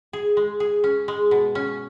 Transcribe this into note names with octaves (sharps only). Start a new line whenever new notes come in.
G#4
G#3
G#4
C#4
G#3
B2
C#4